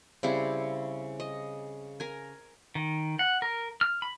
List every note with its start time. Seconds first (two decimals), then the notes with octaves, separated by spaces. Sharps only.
0.23 C#3 G3 C4 E4
1.20 D#5
2.00 A#4 G#5
2.75 D#3
3.19 F#5
3.42 A#4
3.81 F6
4.02 B5